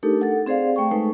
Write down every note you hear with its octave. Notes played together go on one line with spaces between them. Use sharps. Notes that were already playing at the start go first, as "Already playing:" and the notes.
A3 D4 D#4 G4 A4 A#4
A4 F#5
C4 G#4 C5 D5 F5
A3 G5 C#6
G#3 A3 D#4 A4 B4